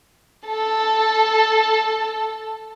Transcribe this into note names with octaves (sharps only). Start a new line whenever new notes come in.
A4 A5